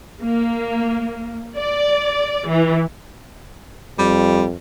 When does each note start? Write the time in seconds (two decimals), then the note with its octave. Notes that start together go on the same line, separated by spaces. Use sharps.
0.20 A#3
1.56 D5
2.49 E3
3.98 F2 G3